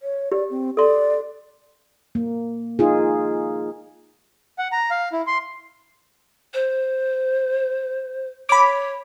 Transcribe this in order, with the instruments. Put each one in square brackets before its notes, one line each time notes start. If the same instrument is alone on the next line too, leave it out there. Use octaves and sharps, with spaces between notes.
[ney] C#5
[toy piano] G4 [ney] D5
[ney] C4
[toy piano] A4 C6 [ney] D5
[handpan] A#3
D#4 F4 G#4
[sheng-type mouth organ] F#5
A#5
F5
E4
C6
[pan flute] C5
[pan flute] C#5 [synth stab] B5 D6